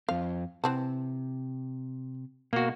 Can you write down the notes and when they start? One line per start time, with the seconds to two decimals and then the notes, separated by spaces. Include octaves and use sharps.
0.09 F2 C4 F5
0.64 C3 E3 C4 A5
2.53 B2 A#3 F#4